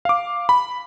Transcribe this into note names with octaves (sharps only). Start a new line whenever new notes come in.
F5 D6
B5